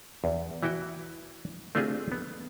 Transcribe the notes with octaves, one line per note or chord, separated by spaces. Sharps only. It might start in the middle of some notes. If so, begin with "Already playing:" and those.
E2
E3 E4 F#4 G5
A3 C4 D4 F4 G4 G#4
B3